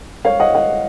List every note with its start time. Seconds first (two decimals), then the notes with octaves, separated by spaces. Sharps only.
0.25 C#5 F5
0.40 D#5 F#5
0.55 D#5 F#5